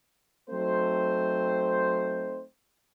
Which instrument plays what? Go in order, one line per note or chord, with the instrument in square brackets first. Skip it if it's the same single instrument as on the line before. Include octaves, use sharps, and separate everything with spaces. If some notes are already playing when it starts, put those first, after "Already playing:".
[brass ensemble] F#3 A3 C4 D#4 C5